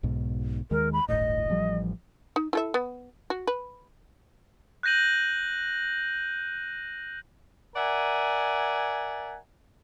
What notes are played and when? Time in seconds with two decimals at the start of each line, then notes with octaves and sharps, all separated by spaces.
0.03 B1 G#2 B2
0.71 D#2 D#3 G#3 A#4
0.93 B5
1.08 D1 G1 A2 D#5
1.50 A1 F3 G3
2.36 D#4
2.53 E4 A4 E5
2.74 B3
3.30 F#4
3.47 B4
4.83 F#6 G6 A#6 D#7 F#7
7.76 A#4 D5 E5 F#5 G#5